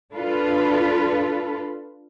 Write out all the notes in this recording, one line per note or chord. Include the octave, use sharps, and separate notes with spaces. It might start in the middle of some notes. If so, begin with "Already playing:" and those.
D4 F4 A4 B4